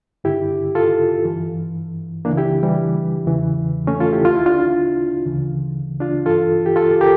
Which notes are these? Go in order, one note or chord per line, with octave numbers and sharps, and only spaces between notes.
G2 D3 E4 G4
F4 A4
G2 E3
C#2 C#3 E3 A#3 D4
E4 G4
E3 G3
E2 C#3 E3
A3 C#4
F4 A4
E4 G4
D2 D3 F4
E4
D4 F4
D2 C#3 E3
D4 F4
G2 E3 F4 A4
G4
F4 A4
G4 A#4